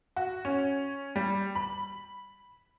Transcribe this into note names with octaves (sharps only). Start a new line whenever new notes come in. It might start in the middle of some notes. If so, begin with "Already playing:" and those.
F#4
C#4
G3
B5